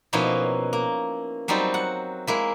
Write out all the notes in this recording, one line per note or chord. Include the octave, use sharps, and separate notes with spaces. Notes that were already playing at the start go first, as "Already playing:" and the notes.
B2 F3 A#3 C#4 D#4 E4
A#3
F#3 G3 C4 D#4 F4
F#5
G#3 A#3 E4